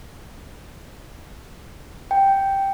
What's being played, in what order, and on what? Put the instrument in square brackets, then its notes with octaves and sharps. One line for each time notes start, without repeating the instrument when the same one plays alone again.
[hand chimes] G5